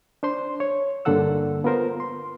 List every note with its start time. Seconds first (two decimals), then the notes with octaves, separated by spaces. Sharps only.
0.23 D4 C5 C6
0.60 C#5
1.05 G2 D3 A#3 A4 F#5 E6
1.64 B3 F4 A#4 C5
2.00 C6